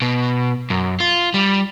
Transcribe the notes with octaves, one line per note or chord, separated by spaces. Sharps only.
B2
F#2
F4
G3